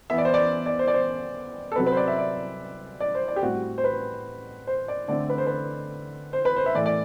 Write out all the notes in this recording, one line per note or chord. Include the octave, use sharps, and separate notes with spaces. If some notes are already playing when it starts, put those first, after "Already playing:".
E3 B3 E5
D5
C5
D5
D5
C5
D5
C5
A4
C3 F#3 C4 B4
B4
C5
D5
E5
D5
D5
C5
D5
G4
A2 G3 C4 F#4
C5
B4
C5
D5
D3 A3 C4 D5
B4
C5
B4
C5
B4
C5
E5
A2 E3 A3 D5
D5